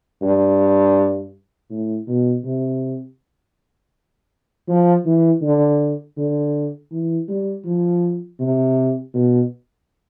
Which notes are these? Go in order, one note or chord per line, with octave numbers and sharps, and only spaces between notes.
G2
A2
B2
C3
F3
E3
D3
D3
E3
G3
F3
C3
B2